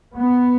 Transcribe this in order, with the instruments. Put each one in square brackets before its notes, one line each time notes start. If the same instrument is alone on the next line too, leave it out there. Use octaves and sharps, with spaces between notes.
[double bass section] B3